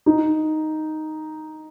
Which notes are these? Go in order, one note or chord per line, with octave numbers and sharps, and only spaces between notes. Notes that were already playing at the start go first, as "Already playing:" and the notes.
D#4